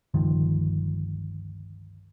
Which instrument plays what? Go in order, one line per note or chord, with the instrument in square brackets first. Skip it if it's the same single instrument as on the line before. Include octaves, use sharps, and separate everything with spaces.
[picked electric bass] G1 C#2 D#3 F3